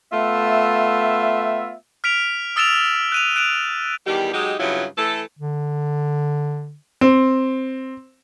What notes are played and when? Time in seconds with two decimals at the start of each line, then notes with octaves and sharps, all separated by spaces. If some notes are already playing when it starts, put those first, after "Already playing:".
0.12 A3 B3 F4 E5
2.04 F6 B6 D7 F7
2.56 D#6 E6 A6 D7 E7 F7
3.12 F#6 D#7 F7
3.36 F#6 D7 E7 F7
4.07 E2 D#3 G3 G4
4.34 F#3 G#3 D#4 G4
4.60 G2 C#3 F#3 E4 F4
4.98 E3 A3 A4
5.39 D3
7.01 C4